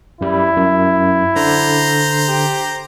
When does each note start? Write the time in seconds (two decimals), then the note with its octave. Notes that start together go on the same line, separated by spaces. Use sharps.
0.21 F#2 G3 E4
0.56 F#2
1.36 D3 C5 A#5
2.29 G4